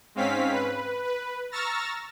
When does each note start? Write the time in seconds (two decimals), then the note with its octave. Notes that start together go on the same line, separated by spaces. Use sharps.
0.15 G#2 C4 C#4 F5 B6
0.52 B4
1.05 B4
1.51 A#5 C#6 E6 F6 A6 A#6